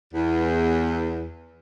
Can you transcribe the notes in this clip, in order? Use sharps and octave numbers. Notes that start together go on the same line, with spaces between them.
E2